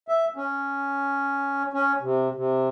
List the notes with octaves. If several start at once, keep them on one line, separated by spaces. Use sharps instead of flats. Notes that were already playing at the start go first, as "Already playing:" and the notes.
E5
C#4
C#4
C3
C3